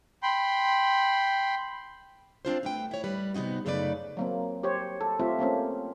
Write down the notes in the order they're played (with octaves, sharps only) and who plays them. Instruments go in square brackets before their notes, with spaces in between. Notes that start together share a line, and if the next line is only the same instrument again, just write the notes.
[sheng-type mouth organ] G5 B5 C6
[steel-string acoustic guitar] C4 D4 F4 C5
A3 B4 G5
E4 C#5
G3 B4
C3 B3 C#4 D#4 F#4
F#2 C#3 A3 D#4 B4 D5
[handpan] F#3 A#3 C4
G4 C5 C#5
A4
A3 C4 F4 G4 A4 E5
A3 A#3 C4 C#4